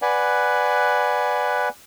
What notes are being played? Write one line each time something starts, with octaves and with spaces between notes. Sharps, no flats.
B4 D5 F#5 G#5